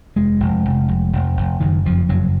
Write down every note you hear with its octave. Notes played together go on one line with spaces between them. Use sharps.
F1 G#3
F1
F1
F1
F1
F1
F#1 D#3
F2 F3
F#1 F#3